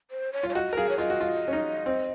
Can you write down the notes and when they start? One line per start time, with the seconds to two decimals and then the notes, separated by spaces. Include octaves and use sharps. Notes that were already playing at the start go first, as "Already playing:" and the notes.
0.11 C5
0.33 C#5
0.43 F4
0.49 C#5
0.55 F#4 D#5
0.73 A#4
0.76 G#4 F5
0.89 C#5
0.98 F4 D#5
1.10 F#4
1.21 F4
1.48 C#4
1.53 D#4
1.86 C4